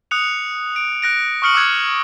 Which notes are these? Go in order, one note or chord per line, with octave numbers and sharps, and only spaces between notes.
D#6 F#6 C#7 F7
D7
F#6 A#6 D7
C#6 D#6 F6 C#7 F#7
D6 E6 F#6 G#6